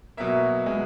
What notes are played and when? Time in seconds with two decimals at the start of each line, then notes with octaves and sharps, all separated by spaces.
0.17 B2 F#3 A#3 E5
0.66 B2 G#3